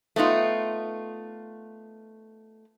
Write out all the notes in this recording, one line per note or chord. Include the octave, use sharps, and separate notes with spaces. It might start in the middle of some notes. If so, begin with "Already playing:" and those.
A3 B3 D#4 F4